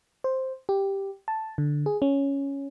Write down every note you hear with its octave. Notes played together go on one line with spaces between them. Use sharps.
C5
G4
A5
D3
G#4
C#4